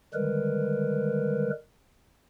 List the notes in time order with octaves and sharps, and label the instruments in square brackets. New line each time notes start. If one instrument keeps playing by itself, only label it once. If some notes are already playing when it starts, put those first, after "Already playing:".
[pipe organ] D3 D#3 G3 G#3 A#4 B4